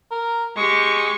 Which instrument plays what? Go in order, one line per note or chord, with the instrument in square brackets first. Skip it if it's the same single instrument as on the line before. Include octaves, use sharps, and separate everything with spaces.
[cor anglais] A#4
[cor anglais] G#3 [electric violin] G4 C#6